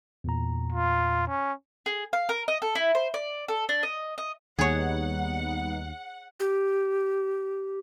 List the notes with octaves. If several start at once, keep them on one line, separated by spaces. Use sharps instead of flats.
E2 A#2 A#5
F4
C#4
G#4
F5
A#4
D#5
A4
E4
C5
D5
A4
D4
D#5
D#5
D#2 G3 B3 D#4 G#4 C#5 F#5
G4